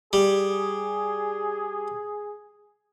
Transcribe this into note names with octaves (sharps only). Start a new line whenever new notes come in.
G3 G#4